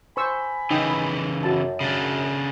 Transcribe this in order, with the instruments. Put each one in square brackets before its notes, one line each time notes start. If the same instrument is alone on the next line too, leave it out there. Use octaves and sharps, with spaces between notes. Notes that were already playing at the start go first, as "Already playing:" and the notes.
[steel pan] C5 C#6 E6 [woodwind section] G#5 B5
[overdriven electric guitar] C#3 E3 [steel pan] D#4 G5 D#6
[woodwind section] F#2 [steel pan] F#4 A5
[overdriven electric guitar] C#3 D4